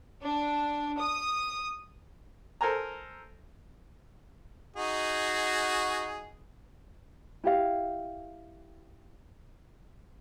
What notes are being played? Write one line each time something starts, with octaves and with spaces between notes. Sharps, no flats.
D4
D#6
A4 A#4 C5 G#5 A#5
D#4 F#4 G#4
E4 G4 F5